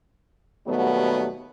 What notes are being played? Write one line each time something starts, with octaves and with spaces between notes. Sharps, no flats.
D#2 B2 F#3 G3 A3 B3